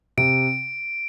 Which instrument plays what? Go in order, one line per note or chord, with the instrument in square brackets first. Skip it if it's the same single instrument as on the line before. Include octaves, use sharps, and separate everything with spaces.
[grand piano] C3 [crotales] D7